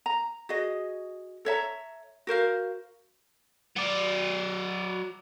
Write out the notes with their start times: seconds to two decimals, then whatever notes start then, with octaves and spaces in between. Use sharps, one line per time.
0.06 A#5
0.49 F#4 G#4 D#5
1.45 A4 C#5 E5 A#5
2.27 F#4 A#4 C5 F5
3.76 F#3 D5